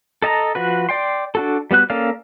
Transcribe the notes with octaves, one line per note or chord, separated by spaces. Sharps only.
A4 D#5 A5 A#5
F3 F#4 B4
D5 G5 C6
D4 F#4 A4
G3 B3 F#4 F#6
A#3 C#4 A4 D5 F5